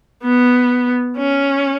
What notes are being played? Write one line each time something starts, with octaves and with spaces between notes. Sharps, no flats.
B3
C#4